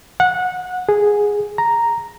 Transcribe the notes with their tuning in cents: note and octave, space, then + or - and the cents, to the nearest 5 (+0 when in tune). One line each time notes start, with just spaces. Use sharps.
F#5 -20
G#4 -5
A#5 +0